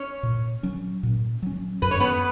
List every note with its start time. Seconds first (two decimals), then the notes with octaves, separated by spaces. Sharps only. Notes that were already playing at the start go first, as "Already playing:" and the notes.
Already playing: C#4 C#5
0.23 A#2
0.63 F#3 C#4
1.03 A#2
1.42 F#3 C#4
1.82 F#2 B4
1.91 C#5
2.00 B3 B4